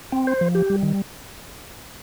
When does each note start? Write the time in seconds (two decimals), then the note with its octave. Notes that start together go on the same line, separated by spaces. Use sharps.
0.12 C4
0.27 C5
0.41 F3
0.55 G4
0.70 G3
0.83 D#3